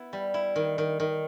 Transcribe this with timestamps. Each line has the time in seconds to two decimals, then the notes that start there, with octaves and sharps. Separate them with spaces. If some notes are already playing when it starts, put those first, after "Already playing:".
Already playing: B3 E4
0.13 G3
0.34 E4
0.56 D#3
0.78 D#3
1.00 D#3